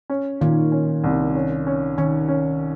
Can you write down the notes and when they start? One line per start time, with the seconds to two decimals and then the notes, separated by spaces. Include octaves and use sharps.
0.10 C#4
0.41 A#2 D#3
0.72 C#4
1.04 C2
1.35 C#4
1.67 C#4
1.98 D#3 C#4
2.28 C#4